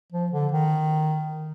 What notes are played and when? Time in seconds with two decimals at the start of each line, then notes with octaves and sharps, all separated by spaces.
0.12 F3
0.32 D3
0.52 D#3